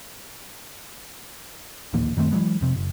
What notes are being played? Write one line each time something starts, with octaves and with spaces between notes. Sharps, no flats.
D1 A#1 D#2 A#3
F#2 D#3 A3 C4
E3 F#3 G#3 B3
F2 C3
F#1